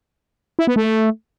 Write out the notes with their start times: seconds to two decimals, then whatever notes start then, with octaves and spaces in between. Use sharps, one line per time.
0.59 E4
0.67 B3
0.76 A3